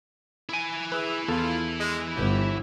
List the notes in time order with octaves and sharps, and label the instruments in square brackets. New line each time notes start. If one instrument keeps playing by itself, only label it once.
[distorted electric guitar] E4 G#5
[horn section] G#4 E5 [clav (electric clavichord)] B4
[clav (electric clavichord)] E2 A4 [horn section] F4
[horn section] G#3
[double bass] G1 [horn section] B3 G4